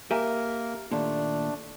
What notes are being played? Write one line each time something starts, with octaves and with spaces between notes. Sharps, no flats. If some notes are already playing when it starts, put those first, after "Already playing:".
A#3 G4 A#4 E5 G#5
D#2 A#2 A3 D4